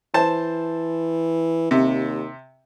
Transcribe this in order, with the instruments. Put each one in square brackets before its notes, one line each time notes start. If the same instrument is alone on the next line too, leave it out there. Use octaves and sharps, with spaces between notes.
[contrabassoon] E3 [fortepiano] C5 A5
[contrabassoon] D#2 [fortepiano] C3